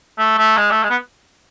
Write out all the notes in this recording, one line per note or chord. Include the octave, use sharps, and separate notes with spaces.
A3
A3
G#3
A3
G#3
B3